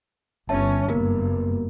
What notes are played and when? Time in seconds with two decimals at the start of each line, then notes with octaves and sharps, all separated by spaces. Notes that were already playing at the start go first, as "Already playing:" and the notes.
0.49 G1 C#4 C#5 E5 A5
0.90 F#1 G2 A#3 B3 A#4